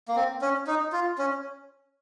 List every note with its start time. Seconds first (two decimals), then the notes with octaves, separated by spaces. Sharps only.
0.08 A#3
0.16 C4
0.42 C#4
0.67 D#4
0.92 F4
1.18 C#4